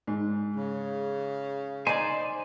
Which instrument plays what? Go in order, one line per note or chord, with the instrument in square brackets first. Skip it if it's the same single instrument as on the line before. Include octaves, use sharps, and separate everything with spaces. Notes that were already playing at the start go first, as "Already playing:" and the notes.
[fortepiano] G#2
[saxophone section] C#3
[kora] D#4 D5 [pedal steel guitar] C5 G#5